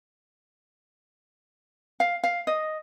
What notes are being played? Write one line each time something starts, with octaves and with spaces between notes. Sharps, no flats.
F5
F5
D#5